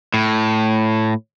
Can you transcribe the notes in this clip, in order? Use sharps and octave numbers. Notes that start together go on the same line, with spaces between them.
A2